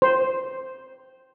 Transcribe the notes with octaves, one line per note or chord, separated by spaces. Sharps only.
C5